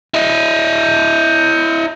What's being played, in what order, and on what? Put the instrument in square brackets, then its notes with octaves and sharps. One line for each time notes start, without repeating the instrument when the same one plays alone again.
[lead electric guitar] E4 D#5